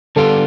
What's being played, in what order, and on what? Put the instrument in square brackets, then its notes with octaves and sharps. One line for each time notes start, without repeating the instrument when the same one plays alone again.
[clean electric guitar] D3 G3 B3 D4 F4 [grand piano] A4